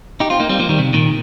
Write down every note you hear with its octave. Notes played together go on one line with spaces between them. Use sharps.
D#4 G4
C4 F4
A#3 D#4
G3 C4
F3 A#3
D#3 G3
C3
A#2 D#3